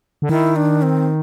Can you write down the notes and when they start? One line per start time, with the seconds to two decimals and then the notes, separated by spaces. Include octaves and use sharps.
0.22 D3
0.29 D#3 E4
0.56 D4
0.82 C4